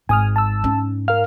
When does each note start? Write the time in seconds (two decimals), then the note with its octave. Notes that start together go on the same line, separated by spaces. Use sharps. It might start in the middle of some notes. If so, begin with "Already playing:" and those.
0.09 G#1 G#2 G#5 D#6 F6
0.36 A5 E6
0.64 C#4 D4
1.08 A#4 F5 F6